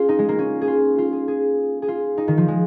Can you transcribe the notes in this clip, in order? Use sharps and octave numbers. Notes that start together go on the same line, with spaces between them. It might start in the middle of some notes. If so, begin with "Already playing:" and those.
Already playing: C#4 F4 G#4
D#4
G#3
A#3
C#4
G#4
F4
F4
G#4
G#4
G#4
F4
D#4
D#3
F3
G#3